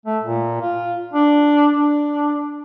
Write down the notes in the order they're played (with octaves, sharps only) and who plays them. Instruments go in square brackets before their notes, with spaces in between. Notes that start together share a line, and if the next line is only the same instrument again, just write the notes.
[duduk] A3
A#2
F4
D4
D4